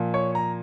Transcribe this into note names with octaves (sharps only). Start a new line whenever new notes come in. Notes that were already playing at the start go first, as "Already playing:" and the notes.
Already playing: A#2 F3
C#5
A#5